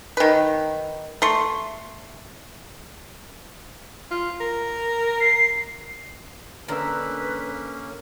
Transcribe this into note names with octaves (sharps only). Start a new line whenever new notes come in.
D#3 B4
A3 C6
F4
A#4
C7
D3 A#3 C#4 A#4 B4 A#5 E6